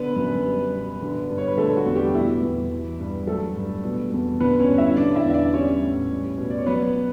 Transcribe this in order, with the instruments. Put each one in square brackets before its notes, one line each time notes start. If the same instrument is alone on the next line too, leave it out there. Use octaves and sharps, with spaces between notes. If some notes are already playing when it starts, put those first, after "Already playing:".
Already playing: [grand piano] D3 B3 B4
F#2
G3
B2
D3
G2
C#5
B4
D3 A3 A4
F#4
E2
G3 G4
B2 E4
E2
E3
G2
F#3 A3 A4
G2
B2
E2
D3 B3 B4
C#4 C#5
G2
E4 E5
D3 D4 D5
E4 E5
E2 E5
D4 D5
G3 C#4 C#5
A2
G3
B2
D5
C#5
F#3 B3 B4